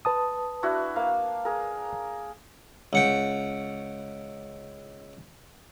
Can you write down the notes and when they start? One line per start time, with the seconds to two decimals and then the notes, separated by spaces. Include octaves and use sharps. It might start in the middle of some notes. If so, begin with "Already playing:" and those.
0.05 B4 A5 D#6
0.63 D4 E4 F#4
0.96 A#3 F5
1.45 G#4 A#4
2.93 C#2 F#5 G5